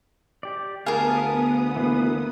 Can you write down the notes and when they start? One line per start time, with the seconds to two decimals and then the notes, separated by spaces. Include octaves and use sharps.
0.43 G4 D5
0.86 D2 B3 G#4 A#4 F5 A5 D#6
1.76 E3 A#3 B4